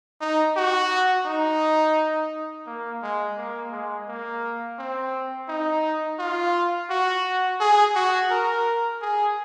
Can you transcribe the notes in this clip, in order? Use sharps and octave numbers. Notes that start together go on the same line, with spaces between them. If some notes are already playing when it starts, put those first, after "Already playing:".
D#4
F#4
D#4
A#3
G#3
A#3
G#3
A#3
C4
D#4
F4
F#4
G#4
F#4
A#4
G#4